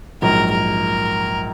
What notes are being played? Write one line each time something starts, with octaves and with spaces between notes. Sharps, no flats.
A#1 G#2 F#3 A#4
A#4